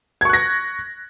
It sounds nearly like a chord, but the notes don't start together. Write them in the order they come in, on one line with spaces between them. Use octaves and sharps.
G#6 C#6 F#6 A#6